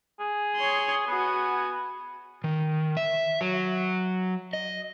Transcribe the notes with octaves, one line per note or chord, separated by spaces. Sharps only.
G#4
C#5 C6
B3 F#4 G#5
D#3
E5
F#3
D#5